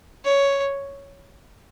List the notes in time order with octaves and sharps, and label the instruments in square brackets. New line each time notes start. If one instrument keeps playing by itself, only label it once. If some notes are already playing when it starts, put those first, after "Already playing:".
[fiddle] C#5